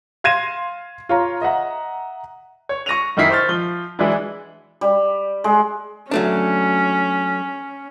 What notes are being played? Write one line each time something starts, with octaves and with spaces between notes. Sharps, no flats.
F5 C6 G#6 A#6 D#7 E7
F4 C#5 A#5
D#5 E5 F#5 A#5
C#5
C#6 A#6 D#7 F7
F#2 D#3 D#4 E4 B6 C7
C5 C#6 F6 A6
F3 G7
E3 F#3 G#3 D4 E4
G3
G#3
F#3 A3 C#4 D4